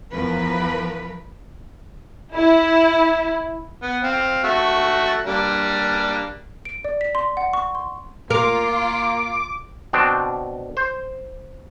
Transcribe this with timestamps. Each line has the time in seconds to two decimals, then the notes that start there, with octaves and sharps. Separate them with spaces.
0.13 E2 F3 A#4 B4
2.34 E4
3.82 B3
4.04 C4 F5
4.44 A3 F#4 E5
5.26 G3 A#3 D4
6.65 D7
6.85 D5
7.01 B6
7.15 C6
7.37 F#5
7.53 C#6
7.75 C6
8.30 A#3 F4 A#4 D6
9.93 B2 C4 D4 G5
10.77 C5